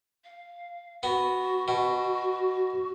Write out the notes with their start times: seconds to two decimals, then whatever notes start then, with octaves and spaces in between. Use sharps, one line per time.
0.25 F5
1.03 B3 F#4
1.68 B2